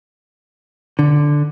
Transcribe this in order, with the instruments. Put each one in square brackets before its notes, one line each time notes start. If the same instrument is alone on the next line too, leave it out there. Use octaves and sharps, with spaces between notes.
[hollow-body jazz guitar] D3